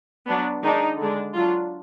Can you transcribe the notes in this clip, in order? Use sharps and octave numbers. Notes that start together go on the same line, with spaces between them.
F#3 B3 D4
D#3 G#3 D4 D#4
D3 G#3 D4
F#3 D4 F4